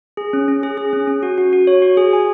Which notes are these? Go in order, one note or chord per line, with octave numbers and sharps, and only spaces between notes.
G#4
C#4
C#4
G#4
G#4
C#4
C#4
F#4
F#4
F#4
C#5
F#4
G#4
G#5